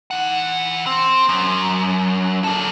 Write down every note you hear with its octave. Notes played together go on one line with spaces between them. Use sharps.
E3 F#5
C4
F#2
A#3 A4